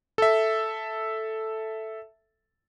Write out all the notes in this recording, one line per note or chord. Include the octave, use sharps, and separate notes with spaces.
A4 E5